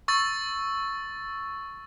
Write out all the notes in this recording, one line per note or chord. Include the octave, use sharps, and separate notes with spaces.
C#6 E6 A6